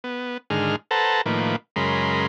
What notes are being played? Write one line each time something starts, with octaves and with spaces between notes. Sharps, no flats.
B3
G#2 D3 D#3 G#4 F6
A4 B4 C5 F#5 A5 A#5
A2 D#3 F3 A#3 B4
F#2 C#3 G#3 A#4 B5 C6